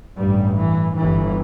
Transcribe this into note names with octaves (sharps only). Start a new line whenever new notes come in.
A1 G2 G3
E3
G1 G2 E3